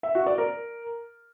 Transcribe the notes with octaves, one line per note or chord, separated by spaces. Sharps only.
E5
F#4
D5
A#4